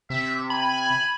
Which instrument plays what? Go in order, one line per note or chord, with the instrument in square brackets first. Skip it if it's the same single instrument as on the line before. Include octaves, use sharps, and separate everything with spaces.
[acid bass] C3 [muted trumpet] E5
[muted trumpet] G#5 [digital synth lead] B5